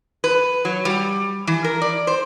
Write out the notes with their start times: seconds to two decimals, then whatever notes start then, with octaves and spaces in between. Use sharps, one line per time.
0.24 B4
0.65 F#3
0.85 G3
1.47 E3
1.64 A#4
1.82 D5
2.07 C5